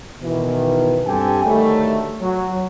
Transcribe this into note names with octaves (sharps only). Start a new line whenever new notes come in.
B2 D#3 E3
G2 C4 G4 A4 G#5
D2 D#3 F#3 G3 A3
F#3